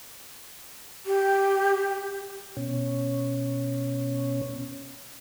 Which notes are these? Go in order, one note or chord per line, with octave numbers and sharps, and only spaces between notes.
G4
B2 C#4